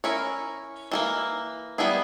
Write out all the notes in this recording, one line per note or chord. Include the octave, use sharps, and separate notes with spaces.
C#4 E4 A#4 C#5
E3 G3 A#3
G3 B3 E4 G#4